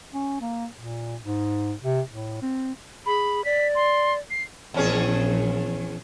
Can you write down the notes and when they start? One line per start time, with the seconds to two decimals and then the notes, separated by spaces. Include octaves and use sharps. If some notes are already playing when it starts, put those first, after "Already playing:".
0.14 C#4
0.41 A#3
0.76 A#2
1.22 G#2
1.83 C3
2.10 A2
2.42 C4
3.06 G#4 B5
3.44 D5 B6
3.75 C6
4.30 C7
4.74 A#1 E2 C#4 G#4